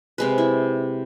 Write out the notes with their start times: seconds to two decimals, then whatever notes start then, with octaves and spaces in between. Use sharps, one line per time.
0.18 C3 G#3 B4
0.38 E4